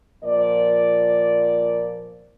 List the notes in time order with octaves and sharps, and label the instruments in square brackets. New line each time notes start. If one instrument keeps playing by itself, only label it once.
[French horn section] A#2 F3 A#4 D5